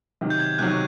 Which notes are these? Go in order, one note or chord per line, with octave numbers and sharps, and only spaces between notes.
C3 D#3 F#3
G6
G#6
G6
C3 D#3 F#3 F#6
C#6